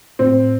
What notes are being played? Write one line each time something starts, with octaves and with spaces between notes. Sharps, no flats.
A2 C4